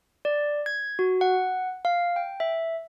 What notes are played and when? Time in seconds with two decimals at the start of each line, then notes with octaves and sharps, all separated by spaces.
0.25 D5
0.66 G#6
0.99 F#4
1.21 F#5
1.85 F5
2.16 G5
2.40 E5